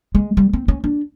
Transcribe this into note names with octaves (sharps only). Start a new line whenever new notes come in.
G#3
G3
C4
C#4
D4